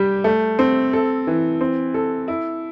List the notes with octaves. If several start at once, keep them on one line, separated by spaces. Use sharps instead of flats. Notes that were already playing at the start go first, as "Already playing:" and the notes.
Already playing: G3 G4
A3
C4
A4
E3
C4
A4
E4